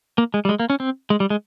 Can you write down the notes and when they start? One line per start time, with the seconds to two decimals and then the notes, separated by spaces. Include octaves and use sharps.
0.18 A#3
0.34 G#3
0.45 G3
0.49 G#3
0.60 A#3
0.70 C#4
0.80 C4
1.10 G#3
1.20 G3
1.30 G#3